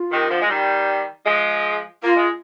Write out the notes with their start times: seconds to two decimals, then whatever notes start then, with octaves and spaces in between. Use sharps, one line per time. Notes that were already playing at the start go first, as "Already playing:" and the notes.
Already playing: F4
0.11 C3 D#3
0.30 D3 F3
0.41 G#3
0.49 D#3 G3
1.26 F3 G#3
2.03 A#3 F4
2.16 G#3